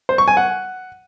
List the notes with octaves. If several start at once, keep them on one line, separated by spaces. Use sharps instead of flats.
C5
C#6
G#5
F#5